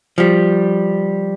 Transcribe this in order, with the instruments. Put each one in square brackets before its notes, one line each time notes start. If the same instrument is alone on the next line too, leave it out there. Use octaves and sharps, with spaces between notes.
[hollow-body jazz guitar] F3 G3